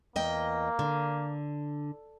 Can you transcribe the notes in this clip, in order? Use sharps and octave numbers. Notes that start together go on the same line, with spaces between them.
E2 A#3 D#5 G5
D3